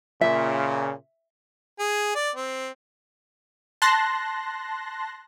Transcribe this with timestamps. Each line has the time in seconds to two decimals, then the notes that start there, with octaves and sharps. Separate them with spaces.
0.21 A#2 C#3 E5
1.80 G#4
2.15 D5
2.36 C4
3.82 A5 C6 F#6 A#6